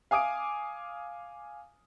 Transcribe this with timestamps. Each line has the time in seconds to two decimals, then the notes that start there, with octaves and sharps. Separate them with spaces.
0.11 F5 G#5 D6 D#6 D7